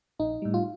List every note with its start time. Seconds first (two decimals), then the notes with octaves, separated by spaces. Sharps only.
0.19 A#1 D#4
0.42 A2 G3
0.54 F4